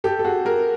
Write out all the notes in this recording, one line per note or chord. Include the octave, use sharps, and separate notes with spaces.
G4 A4
A4
F#4 G#4
G#4 A#4